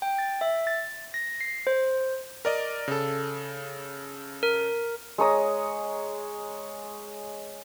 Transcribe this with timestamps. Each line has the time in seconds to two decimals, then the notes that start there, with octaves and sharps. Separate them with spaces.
0.02 G5
0.18 A6
0.41 E5
0.67 A6
1.14 A#6
1.41 C7
1.67 C5
2.45 A#4 D5 D#5
2.88 C#3 A4
4.43 A#4
5.18 G#3 C#5 A#5 D#6